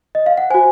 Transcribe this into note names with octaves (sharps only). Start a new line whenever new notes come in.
D#5
F5
F#5
F#4 C5 G#5